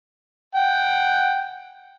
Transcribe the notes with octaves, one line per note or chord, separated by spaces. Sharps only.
F#5 G5